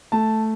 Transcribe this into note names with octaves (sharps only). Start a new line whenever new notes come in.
A3 A5